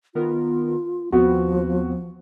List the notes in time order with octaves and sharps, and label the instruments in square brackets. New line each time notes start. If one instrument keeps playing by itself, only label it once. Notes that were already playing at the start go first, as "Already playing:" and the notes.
[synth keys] D#3 B3 A#4 [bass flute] F4
[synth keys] D#2 B3 C4 [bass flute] F3 [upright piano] F#4